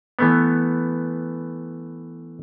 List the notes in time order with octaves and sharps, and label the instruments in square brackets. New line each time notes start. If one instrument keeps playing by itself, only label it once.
[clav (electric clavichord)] E3 A3 B3